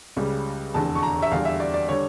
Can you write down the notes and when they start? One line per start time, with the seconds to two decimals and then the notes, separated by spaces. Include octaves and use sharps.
0.16 C#2 C#3 G3
0.74 F1 E2 D3 A5
0.95 C#6
1.03 A#5
1.22 E5
1.31 E2 D3 G3 F5
1.45 E5
1.60 D5
1.74 D5
1.89 D3 G3 C#5